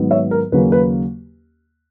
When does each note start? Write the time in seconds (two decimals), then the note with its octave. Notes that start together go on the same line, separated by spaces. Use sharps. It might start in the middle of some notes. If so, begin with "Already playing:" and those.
Already playing: G#2 D#3 F#3 B3
0.11 C#5 E5
0.31 A#4
0.52 D#2 C#3 F#3 A#3 C#4 B4
0.72 B4